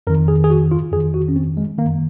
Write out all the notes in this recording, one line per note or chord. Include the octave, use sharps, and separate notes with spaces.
F2 D#3 A#4
G#4
G#4
F#4
F4
F2 D#3 G#4
F#4
C#4
C4
G#3
D#3 A#3
F#2